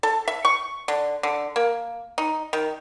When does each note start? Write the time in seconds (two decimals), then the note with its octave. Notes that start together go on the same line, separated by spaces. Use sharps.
0.03 A4
0.28 E5
0.45 C#6
0.88 D3
1.23 D3
1.56 A#3
2.18 D#4
2.53 D#3